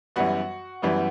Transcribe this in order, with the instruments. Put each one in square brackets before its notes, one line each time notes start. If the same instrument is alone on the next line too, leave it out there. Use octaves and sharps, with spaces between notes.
[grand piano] F#2 E3 G3 B3 F#4 F#5
F#2 E3 G3 B3